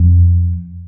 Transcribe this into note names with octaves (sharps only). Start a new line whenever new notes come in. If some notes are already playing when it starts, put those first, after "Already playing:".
Already playing: F2